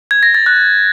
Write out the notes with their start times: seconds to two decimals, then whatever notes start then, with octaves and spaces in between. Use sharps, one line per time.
0.11 G#6
0.23 A#6
0.35 A6
0.46 F#6